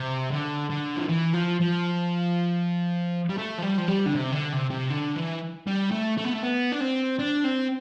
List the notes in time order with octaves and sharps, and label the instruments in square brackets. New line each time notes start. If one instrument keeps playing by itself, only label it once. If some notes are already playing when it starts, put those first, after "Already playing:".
Already playing: [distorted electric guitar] C3
D3
D3
F3
E3
F3
F3
G3
A3
F3
G3
F3
G3
D3
C3
D3
C3
C3
D3
E3
G3
A3
A3
B3
A3
B3
D4
C4
D4
C4